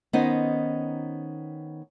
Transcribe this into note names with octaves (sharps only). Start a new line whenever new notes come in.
D#3 B3 C#4 D#4 C5 D#5